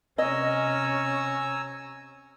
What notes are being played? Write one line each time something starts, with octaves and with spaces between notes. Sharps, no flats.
C3 C#4 D#5 G#5 A#5 E6